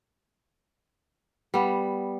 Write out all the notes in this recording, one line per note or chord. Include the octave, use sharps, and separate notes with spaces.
G3 B3